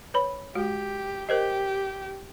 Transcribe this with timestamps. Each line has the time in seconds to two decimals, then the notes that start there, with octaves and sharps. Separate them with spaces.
0.14 B4 C#5 B5
0.55 G#3 F#4 G4
1.29 G4 A#4 C5 D#5